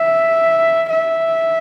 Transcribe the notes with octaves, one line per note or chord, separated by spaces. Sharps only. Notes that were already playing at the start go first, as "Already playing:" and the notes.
Already playing: E5
E5